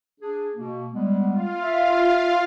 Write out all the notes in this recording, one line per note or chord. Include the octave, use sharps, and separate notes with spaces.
D4 G#4
B2 A#3
G3 G#3 B3
F4 F5
E5